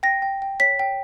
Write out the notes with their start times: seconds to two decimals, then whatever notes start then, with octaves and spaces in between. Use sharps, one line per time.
0.03 G5 A#6
0.22 G5
0.42 G5
0.60 C#5 B6
0.79 G5